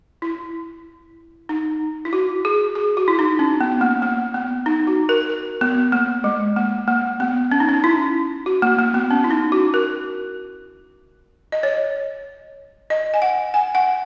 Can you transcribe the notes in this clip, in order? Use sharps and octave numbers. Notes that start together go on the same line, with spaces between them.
E4
D#4
E4
F#4
G#4
G#4
F#4
E4
D#4
C#4
B3
A#3
A#3
B3
D#4
F#4
A#4
A#4
B3
A#3
G#3
A#3
A#3
B3
C#4
D#4
C#4
E4
F#4
A#3
A#3
B3
C#4
E4
D#4
F#4
A#4
D#5
C#5
D#5
G#5
F#5
G#5
F#5